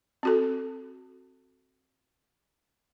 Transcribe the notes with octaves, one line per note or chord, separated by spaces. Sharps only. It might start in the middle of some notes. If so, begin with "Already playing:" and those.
C4 F#4 A4